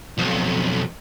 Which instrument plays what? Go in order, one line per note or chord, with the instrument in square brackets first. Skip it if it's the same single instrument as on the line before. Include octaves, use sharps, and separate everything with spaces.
[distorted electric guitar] B1 F2